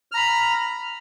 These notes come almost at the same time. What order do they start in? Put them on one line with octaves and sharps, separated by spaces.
F6 A#5 B5